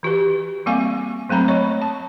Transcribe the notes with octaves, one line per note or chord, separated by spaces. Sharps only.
E3 F#4 G4 B4
G3 A#3 C4 F5 G#5 C#6
F#3 A3 C4 A#5 B5
C#5 D#5 C#6
A5